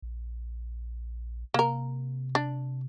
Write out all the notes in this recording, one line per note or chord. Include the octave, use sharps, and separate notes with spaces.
A#1
C3 A#3 A#4
D4